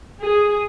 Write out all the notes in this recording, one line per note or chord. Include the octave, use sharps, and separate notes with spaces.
G#4